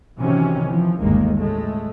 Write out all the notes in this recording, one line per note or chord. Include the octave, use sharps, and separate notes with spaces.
C3 D#3 E3 F#3 C#4
E3 F3
G1 D#2 D#3 G#3 A#3
C#2 A2 G#3 A3